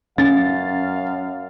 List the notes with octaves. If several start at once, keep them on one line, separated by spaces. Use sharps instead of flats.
F#2 C#4 F5 A6